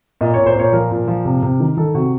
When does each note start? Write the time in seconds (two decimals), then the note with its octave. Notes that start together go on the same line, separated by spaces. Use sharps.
0.21 A#2 D#5
0.34 A#2 C#5
0.46 C5
0.55 A#2 C#5
0.73 F3 A#4
0.91 A#2
1.07 F3
1.25 C3
1.42 C3
1.60 D#3
1.77 D#3 A4
1.94 C3 F#4